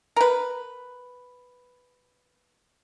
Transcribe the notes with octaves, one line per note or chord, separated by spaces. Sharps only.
A#4 B4